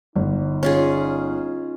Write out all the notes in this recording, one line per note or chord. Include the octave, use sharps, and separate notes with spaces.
G1 D#4
C#4 F4 G#4